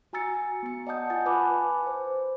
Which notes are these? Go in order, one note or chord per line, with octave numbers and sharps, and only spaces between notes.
F#4 G#5 A#5 E6 A6 C#7
B3 C#7
D5 D#5 F#5 A5 D#6 G6
F4 F#5 G#5 A6
B4 G#5 A5 B5 D6 F#6
B4 C5